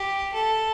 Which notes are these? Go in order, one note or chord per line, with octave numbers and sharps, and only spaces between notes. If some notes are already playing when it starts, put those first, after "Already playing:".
Already playing: G4
A4